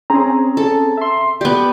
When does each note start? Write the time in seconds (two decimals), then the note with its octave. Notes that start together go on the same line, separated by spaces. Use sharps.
0.10 C4 C#4 G#4 A#5
0.57 A4
0.97 E5 C6
1.41 B3 G4 D5